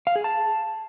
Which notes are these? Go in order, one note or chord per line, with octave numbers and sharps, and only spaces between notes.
F5
G#4
A5